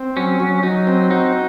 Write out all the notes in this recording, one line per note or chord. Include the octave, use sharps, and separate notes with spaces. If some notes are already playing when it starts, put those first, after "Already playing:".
Already playing: C4
F#3 C#4
F#3
F#3 D#4
C4
D#4 F#4